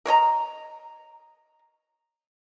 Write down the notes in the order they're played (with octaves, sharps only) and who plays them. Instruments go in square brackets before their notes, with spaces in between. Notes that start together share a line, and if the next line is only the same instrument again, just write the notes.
[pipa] A#4 C#5 D#5 A#5